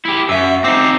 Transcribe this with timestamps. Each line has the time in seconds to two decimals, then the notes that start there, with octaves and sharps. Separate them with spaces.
0.05 E4 G4
0.29 F#2 E5 E6
0.64 C4 D#4 D6 A#6 C7